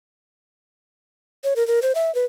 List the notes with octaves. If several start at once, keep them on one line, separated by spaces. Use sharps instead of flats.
C#5
A#4
A#4
C5
E5
B4